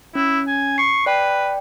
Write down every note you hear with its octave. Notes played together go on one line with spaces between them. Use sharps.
C#4 E4
G#5
C#6 C7
B4 D5 G5